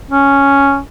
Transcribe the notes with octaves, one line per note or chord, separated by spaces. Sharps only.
C#4